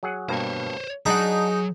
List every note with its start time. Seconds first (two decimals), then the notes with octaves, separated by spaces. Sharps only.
0.03 F#3 G#4 F#5
0.29 G2 B2 A#3 C5 C#5
1.06 F#3 D4 D#4 G#4 F#5